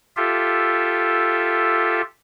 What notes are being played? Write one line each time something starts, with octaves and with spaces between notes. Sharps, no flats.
F4 G4 A4 E5